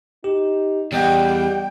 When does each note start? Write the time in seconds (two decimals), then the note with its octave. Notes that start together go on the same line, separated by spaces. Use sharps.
0.24 D#4 G4
0.93 E2 G3 D5 D#5 F#5 G5